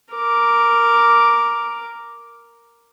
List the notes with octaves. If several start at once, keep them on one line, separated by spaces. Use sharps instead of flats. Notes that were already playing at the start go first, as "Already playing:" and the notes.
A#4 D6